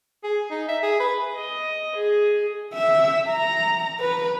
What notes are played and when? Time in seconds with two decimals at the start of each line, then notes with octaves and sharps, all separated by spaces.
0.24 G#4
0.51 D#4
0.68 E5
0.83 G#4
1.00 B4
1.35 D#5
1.95 G#4
2.74 E5
3.30 A#5
4.00 B4